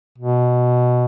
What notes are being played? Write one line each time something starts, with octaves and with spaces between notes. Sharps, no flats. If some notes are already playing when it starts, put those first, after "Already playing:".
B2